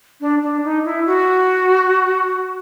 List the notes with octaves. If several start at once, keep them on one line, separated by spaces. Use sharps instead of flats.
D4
D4
D#4
E4
F#4